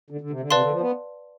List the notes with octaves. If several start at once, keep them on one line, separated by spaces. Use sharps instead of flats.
D3
D3
C3
D3
C3 B4 D5 F5 A5 C6
D3
F3
B3